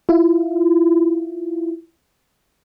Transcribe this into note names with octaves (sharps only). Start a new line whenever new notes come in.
E4 F4